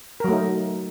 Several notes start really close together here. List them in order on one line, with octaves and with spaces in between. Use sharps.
A#4 F#3 A3 D#4